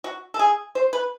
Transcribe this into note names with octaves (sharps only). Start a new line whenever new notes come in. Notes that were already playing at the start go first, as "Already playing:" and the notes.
F#4
A4
G#4
C5
B4